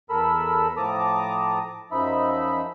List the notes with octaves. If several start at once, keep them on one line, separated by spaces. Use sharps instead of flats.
E2 A4 A#4 B5 E6
A2 F3 A5 A#5 D6 D#6
F#2 F3 D#4 E5 B5